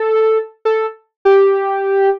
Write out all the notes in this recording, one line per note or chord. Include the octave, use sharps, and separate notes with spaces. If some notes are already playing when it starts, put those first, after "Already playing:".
Already playing: A4
A4
G4